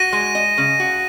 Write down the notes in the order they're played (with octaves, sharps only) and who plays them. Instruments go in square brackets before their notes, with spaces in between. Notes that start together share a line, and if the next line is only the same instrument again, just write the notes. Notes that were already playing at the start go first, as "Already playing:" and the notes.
Already playing: [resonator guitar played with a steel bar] F#4 [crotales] A#6 D#7
[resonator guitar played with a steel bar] G#3
D#5
C#3
F#4